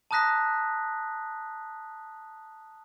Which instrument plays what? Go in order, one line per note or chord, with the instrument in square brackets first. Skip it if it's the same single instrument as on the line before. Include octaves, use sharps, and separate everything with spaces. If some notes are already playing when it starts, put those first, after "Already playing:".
[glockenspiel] A5 A#5 D#6 F#6 A#6 B6